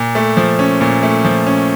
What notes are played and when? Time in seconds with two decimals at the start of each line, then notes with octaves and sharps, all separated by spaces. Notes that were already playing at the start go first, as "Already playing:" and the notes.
Already playing: A#2
0.15 A3
0.37 F3
0.59 C#4
0.81 A#2
1.03 A3
1.24 F3
1.47 C#4